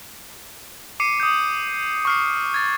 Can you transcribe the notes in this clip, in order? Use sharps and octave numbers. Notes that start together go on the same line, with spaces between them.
D6 C7 C#7 D#7
D#6 G6
C#6 F6 C7
G#6 A6